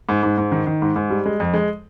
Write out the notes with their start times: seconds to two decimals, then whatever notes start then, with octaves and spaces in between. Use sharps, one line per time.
0.09 G#2
0.23 G#2
0.38 G#2
0.52 D#3
0.67 D#3
0.82 G#2
0.96 G#2
1.10 G3
1.26 G#3
1.40 F2
1.54 G#3